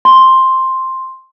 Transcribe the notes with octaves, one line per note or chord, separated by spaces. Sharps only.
C6